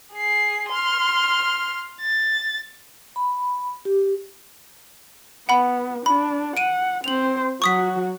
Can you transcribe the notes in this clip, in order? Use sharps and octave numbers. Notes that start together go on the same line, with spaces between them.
G#4 C7
C6 F6
A6
B5
G4
B3 F#5 B5
D4 B5
F#5 D7 D#7
C4 C5 F7 F#7
F#3 F#4 C#6 D#6 B6